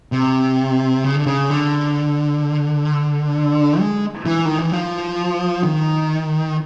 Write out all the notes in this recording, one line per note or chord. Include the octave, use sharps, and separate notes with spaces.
C3
C#3
D3
C#3
D3
G#3
E3
D#3
E3
F3
D#3